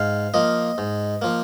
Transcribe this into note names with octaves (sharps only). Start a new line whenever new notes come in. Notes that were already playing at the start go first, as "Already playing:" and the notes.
Already playing: G#2 F5
F3 A#3 D#5
G#2
F3 A#3